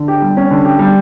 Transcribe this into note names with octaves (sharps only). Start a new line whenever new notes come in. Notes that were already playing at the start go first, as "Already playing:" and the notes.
Already playing: D3
G4
G3
C#4
D3
G4
G3